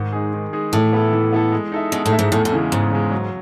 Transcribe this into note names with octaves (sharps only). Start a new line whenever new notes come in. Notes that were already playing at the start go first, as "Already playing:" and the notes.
Already playing: G#2 D#3
G#3 D#4 G#4
D#3
G#3 D#4 G#4
A2 E3
B3 E4 A4
E3
B3 E4 A4
G#3
D#4 A4 E5
B2 G#3
A2
D#4 A4 E5
G#2
E2 A2
A2
C#3 E3 G#3
E2 G#2
C#3 E3 G#3
F#3